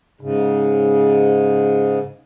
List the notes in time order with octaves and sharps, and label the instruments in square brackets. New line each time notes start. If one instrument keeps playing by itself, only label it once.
[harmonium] G#2 C#3